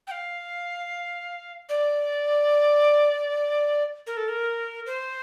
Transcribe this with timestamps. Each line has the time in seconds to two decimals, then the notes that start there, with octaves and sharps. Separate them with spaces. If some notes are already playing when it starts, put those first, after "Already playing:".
0.07 G5
0.11 F5
1.69 D5
4.07 A#4
4.17 A4
4.28 A#4
4.86 C5